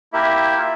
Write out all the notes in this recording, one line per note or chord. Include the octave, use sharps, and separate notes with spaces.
A#3 E4 G4 E5
F4 E5